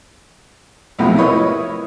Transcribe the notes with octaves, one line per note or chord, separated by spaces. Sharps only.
B1 F2 A2 C3 F3 G#3
E4 A#4 B4 C#5 D#5